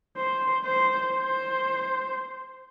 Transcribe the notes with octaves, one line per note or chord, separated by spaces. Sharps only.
C5
C5
C5